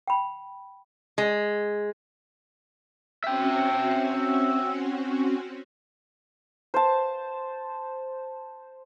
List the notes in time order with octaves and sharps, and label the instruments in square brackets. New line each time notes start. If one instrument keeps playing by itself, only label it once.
[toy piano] G5 B5
[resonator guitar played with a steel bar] G#3
[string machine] C4 C#4 F#4 [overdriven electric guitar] E5 G5
[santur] C5 A5